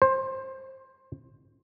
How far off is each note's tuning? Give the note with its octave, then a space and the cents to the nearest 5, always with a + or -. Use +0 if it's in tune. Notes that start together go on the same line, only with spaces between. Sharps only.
C5 +15